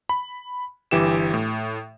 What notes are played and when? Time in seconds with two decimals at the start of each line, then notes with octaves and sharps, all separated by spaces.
0.09 B5
0.91 G1 E3 G4 E7
1.34 A2